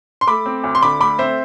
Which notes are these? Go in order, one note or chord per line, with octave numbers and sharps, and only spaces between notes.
C6
A3 B5 D6
C4
D2
C6
D3 B5 D6
A3 B5 D6
C4 C5 E5